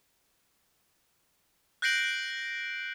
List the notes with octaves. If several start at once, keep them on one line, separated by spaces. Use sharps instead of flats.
F#6 G6 A#6 C7 D7 F#7